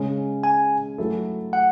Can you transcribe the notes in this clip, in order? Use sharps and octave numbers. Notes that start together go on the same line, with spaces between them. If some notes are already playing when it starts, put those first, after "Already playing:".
Already playing: C#3 G#3 C#4
G#5
F#3 A3 E4 A4
F#5